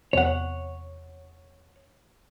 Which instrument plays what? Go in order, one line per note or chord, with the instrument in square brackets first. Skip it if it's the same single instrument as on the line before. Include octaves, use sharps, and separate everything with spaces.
[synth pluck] E2 C3 [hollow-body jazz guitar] C#5 F#5